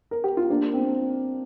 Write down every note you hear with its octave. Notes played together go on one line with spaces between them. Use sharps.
A#4
G4
F4
A#3 D4
C4